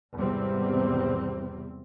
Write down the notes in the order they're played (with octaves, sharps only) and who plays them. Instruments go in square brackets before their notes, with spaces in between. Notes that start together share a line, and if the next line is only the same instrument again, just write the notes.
[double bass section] G#1 E2 C3 G3 C4